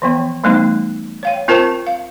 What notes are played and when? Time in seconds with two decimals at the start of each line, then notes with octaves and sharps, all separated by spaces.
0.02 E3 F3 B3
0.44 E3 G3 A3 B3 D#4
1.23 C#5 F5 G5
1.48 C4 F4 A#4 C5 A5
1.87 F5